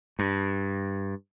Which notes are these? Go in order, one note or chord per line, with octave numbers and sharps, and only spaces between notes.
G2